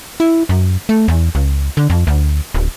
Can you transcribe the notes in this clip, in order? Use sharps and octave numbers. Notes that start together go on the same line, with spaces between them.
E4
F#2
A3
E2
C#2
D3
F2
D2
D1